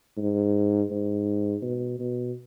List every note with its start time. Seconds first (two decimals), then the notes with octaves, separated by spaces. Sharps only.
0.17 G#2
0.91 G#2
1.62 B2
2.00 B2